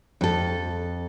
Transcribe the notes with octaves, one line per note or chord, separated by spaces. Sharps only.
F2 A4